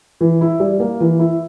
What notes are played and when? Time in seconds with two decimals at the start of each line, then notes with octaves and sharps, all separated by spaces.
0.21 E3
0.41 E4
0.60 G3
0.80 A#3
1.00 E3
1.19 E4